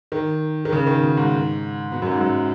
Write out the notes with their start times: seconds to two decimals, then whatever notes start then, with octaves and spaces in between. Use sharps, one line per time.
0.12 D#3
0.65 D#3
0.72 C#3
0.87 D#3
1.01 B2
1.17 G#2
1.92 B2
2.02 F#2
2.11 G#2
2.21 F#2